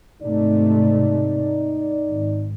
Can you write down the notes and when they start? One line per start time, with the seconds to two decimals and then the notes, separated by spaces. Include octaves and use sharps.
0.22 G#1 C3 A3 D#4 D5
2.07 G#1